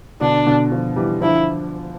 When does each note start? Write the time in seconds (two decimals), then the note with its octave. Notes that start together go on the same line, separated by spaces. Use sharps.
0.21 B2 D3 D4
0.47 B2 D3
0.71 D3 F3
0.96 E3 G3
1.21 D3 F3 E4